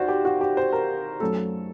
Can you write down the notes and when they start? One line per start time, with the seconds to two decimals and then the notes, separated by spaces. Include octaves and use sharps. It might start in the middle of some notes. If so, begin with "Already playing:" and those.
Already playing: D#2 F#4 C5 D5
0.08 G4
0.25 F#4
0.41 G4
0.57 C5
0.73 A#4
1.20 F#2 F#3 A3 A4